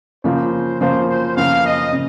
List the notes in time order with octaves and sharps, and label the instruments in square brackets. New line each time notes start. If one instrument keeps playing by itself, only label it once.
[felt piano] C#3 F3 A#3 F4 [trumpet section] C5
[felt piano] C#3 F3 A#3 F4 [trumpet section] C5
[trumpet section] C5
[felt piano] C#3 F3 A#3 F4 [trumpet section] F5
[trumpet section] D#5
[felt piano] C#3